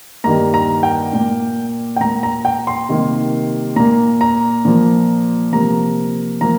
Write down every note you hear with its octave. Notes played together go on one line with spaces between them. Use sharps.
G2 D#3 G3 A#3 A#5
A#5
G5
A#2 A#3
G5
A#2 A#3 A#5
A#5
G5
C6
C3 D#3 G3 A#3
A#2 A#3 A#5
A#5
A#2 F3 A#3
C3 F3 A#3 A#5
F3 A#3 A#5